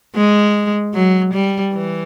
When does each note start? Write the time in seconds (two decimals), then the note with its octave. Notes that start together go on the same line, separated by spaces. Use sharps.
0.15 G#3
0.94 F#3
1.34 G3
1.74 E3